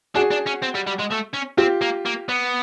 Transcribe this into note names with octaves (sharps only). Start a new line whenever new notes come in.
D4 F#4 G#4
D4
C#4
C4
G3
G3
G#3
A3
C#4
C4 F4 G4
A#3
A#3
B3